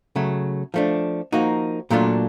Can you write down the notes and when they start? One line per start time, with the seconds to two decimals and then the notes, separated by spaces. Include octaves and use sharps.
0.16 C#3 F#3 A3
0.74 F3 A3 D4
1.32 F3 A#3 D#4 F#4
1.90 A#2 F#3 A3 D4 F4